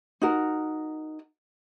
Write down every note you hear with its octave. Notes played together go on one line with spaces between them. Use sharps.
D#4 F#4 A#4